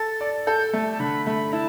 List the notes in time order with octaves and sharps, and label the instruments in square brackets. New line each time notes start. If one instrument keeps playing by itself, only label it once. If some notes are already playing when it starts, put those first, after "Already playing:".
Already playing: [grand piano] A4 [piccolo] A6
[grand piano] D5
[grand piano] A4 [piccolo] G6
[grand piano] A3
[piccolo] A5
[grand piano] D3 [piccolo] B5
[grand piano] A3 [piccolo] B5
[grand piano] E4 [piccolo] A5